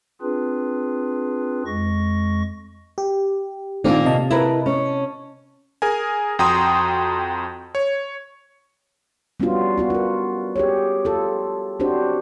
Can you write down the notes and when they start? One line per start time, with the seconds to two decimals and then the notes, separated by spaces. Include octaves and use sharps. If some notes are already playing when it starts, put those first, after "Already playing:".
0.22 C4 D4 F4 G#4 B4
1.66 F2 G#3 C#6 A#6
2.98 G4
3.84 A#2 D#3 A#3 C4 D4
4.05 C3 D#5 A5
4.30 E4 A#4 B4
4.66 C#4
5.82 G#4 A#4 G#5
6.39 F2 F#4 G5 A#5 C6 D#6
7.75 C#5
9.40 G3 B3 C#4 D4 F4 F#4
9.78 B3 F4 F#4
9.90 F4 A#4
10.56 G4 G#4 C#5
11.05 F4 A4
11.80 C4 D4 F#4 G4 C5